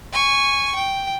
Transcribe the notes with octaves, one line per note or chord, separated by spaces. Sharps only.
G#5 C#6
G5